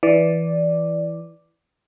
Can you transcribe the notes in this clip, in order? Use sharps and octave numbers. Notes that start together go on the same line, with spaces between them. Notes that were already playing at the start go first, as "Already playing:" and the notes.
E3 D5